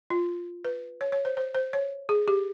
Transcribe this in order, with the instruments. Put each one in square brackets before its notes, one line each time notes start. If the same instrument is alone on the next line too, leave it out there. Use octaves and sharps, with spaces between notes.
[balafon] F4
B4
C#5
C#5
C5
C5
C5
C#5
G#4
G4